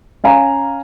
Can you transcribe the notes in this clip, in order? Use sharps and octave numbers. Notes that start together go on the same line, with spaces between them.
C#4 F5 G#5 A#5